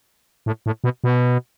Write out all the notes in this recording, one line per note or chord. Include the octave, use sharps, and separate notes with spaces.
A2
A2
B2
B2